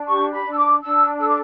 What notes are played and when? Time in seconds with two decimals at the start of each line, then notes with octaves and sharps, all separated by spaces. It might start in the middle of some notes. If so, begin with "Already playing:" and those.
Already playing: D4
0.08 G4 C#6
0.32 B5
0.45 D4
0.52 E6
0.58 D6
0.81 D4 E6
1.19 A4 E6
1.28 D6